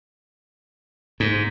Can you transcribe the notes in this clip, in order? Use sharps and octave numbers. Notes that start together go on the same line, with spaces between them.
G#2